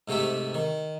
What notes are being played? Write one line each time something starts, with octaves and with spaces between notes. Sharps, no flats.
G#2 C3 A3 G4 E5
D#3